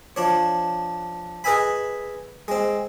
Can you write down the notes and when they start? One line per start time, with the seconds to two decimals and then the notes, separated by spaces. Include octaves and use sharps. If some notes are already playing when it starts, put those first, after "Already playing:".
0.16 F3 D4 C#5
1.44 G#4 B4 D#5 E5 G#5 B5
2.48 G#3 C4